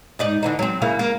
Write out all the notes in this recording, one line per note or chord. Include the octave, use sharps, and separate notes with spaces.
G#2 D#4 D5
D3 E3 D#4
F#3 C4
C#3 A#3 E4
A#3